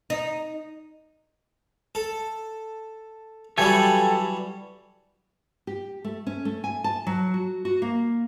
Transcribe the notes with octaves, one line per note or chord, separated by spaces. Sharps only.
D#4
A4
E3 F#3 G3 G4 A4 G#5
G4
A3
C#4
A3
G#5
A5
F#3
F#4
F#4
A#3